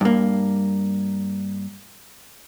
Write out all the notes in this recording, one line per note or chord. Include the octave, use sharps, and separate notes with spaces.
G2 A#3